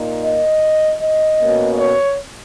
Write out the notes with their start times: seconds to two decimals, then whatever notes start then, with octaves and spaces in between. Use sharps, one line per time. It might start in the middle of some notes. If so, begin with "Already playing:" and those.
Already playing: A#2 A#3 D#4
0.23 D#5
1.00 D#5
1.38 B2 A#3 C#4
1.78 C#5